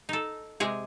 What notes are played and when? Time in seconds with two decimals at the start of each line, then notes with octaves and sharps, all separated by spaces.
0.09 D#4 A4
0.60 C3 G#3 G#4